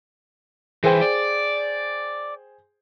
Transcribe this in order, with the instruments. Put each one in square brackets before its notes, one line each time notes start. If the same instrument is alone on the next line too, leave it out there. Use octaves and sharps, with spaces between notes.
[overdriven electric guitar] E3 [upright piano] G#4 C5 G5
[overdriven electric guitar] D5